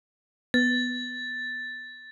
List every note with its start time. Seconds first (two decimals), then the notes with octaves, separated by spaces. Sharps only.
0.54 B3 A6